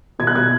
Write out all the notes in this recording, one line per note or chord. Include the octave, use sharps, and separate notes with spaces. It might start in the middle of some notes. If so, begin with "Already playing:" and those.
B2 G#6
F#6
B2 G#6